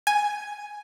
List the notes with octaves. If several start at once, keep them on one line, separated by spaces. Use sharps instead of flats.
G#5